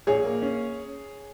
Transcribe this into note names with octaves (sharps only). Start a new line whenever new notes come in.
A#1 G#4 C#5
A#3
C#4